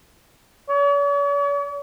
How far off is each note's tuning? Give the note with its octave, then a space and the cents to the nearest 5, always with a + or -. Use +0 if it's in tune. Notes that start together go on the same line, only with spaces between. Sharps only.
C#5 +45